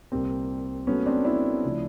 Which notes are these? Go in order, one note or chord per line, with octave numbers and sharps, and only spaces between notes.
C2 A#2 G3 A#3 C4
A#2 F#3 A3 B3 C#4
C4 D4
D4 E4
D2 C#3 F3